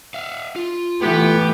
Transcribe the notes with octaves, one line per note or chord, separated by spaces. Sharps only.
E5 F5
F4
E3 A3 B3 G4